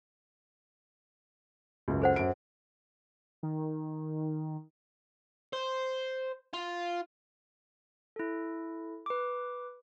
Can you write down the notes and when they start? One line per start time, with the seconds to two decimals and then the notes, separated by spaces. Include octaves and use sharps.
1.88 C#2 F#2
2.02 A4 C5 F#5
2.16 F#2 D7
3.43 D#3
5.53 C5
6.54 F4
8.16 E4 A4
9.06 B4 D6